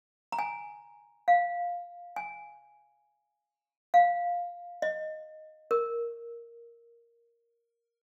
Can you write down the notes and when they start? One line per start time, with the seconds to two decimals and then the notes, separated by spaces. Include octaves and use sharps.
0.32 A#5
0.39 G#5
1.28 F5
2.16 G#5
3.94 F5
4.82 D#5
5.71 A#4